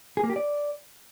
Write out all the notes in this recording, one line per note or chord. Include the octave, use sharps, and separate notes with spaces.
G#4
A#3
G4
D5